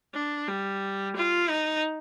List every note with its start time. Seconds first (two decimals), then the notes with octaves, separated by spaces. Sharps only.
0.14 D4
0.48 G3
1.16 F4
1.50 D#4